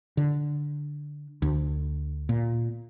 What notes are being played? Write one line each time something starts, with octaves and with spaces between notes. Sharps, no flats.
D3
D2
A#2